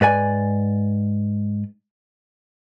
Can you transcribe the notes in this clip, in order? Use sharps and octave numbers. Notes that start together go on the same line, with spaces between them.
G#2 B4 D5 G#5